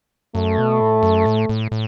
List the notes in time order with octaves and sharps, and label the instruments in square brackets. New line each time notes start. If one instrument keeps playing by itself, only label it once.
[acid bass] F#2 [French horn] A3
[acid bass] B2
A2
F#2
A2
A2
A2